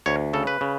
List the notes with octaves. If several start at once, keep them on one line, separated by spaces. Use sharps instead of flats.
D2 C#5
C#3 A4
B4
C#3